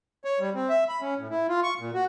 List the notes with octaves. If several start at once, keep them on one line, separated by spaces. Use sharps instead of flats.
C#5
G3
C4
E5
B5
C#4
A2
E4
F4
C#6
A#2
F#4